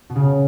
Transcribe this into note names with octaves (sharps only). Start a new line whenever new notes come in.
B2
C#3